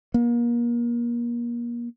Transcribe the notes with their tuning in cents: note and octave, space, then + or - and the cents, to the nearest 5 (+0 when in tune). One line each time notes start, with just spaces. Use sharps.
A#3 +35